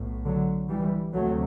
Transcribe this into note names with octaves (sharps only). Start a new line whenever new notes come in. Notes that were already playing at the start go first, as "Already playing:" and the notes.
Already playing: B1 A2
D3 F#3
E3 G3
D2 C3 F#3 A3